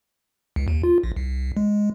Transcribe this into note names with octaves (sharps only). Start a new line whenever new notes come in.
C#2
D#2
F4
A#1
C2
G#3